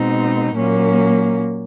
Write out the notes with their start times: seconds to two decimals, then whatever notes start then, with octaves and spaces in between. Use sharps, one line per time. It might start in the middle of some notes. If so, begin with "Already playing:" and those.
Already playing: B2 G#3 C4 D#4
0.56 A#2 F#3 A#3 C#4